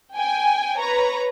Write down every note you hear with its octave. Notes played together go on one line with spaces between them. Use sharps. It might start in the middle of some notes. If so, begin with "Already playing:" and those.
G5 G#5
B4 C#5 A#5